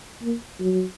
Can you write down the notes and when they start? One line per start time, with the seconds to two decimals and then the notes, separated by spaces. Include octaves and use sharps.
0.22 A#3
0.60 F#3